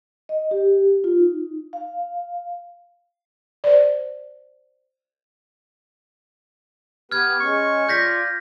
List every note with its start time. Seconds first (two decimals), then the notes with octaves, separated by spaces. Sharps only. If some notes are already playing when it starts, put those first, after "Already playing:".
0.29 D#5
0.51 G4
1.04 F4
1.18 D#4
1.73 F5
3.64 C5 D5
7.11 B3 G4 B4 F6 G#6
7.41 G#3 C#4 C#6
7.89 F4 D5 G6 A#6 B6